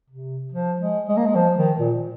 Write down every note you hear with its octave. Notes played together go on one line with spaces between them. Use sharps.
C3
F3
G#3
G#3
A#3
G#3
F3
D#3
A#2